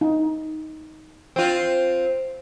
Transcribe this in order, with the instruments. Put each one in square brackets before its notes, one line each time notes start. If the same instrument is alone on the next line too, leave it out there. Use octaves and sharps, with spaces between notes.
[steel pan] D#4
[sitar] C4 F4